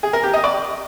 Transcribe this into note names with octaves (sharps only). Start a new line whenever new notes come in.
G#4
A#4
G4
D#5
D5